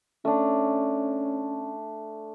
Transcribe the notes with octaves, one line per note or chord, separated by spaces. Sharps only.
A3 C#4 D4